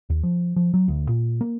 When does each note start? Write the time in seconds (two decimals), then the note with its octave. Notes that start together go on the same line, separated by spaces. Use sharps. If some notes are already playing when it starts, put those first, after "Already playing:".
0.10 D#2
0.23 F3
0.56 F3
0.74 F#3
0.88 D2
1.09 A#2
1.41 A#3